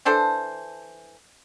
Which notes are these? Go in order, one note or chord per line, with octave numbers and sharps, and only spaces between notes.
E3 D4 A4 C5